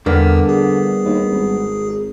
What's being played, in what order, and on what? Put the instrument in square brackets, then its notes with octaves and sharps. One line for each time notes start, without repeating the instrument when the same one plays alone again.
[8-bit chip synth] E2 [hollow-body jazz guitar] G2 A#3 B3 [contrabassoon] D3
[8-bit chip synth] G#4
[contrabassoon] D#2
G#1